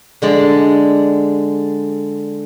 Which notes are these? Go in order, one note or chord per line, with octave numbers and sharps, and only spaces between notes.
D3 G#3 D5